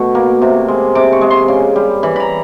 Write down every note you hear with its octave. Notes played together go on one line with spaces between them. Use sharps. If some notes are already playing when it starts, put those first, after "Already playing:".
Already playing: B2 A3 C#6
A#3
C3
G#3
C3 D6
C#6
G#3
C6
C#3
G3
E3 B5
A#5 B5